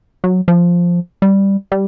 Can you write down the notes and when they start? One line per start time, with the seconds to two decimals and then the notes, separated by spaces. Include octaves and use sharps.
0.24 F#3
0.48 F3
1.22 G3
1.72 G3